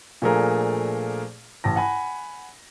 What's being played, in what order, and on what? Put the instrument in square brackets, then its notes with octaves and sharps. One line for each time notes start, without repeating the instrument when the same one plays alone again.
[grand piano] A#2 F3 A3 D4 G#4 A#4
A1 A5 A#6
F#5 G#5 B5